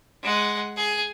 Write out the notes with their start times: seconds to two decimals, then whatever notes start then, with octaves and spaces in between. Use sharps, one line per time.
0.23 G#3 F#5
0.77 G#4 G#5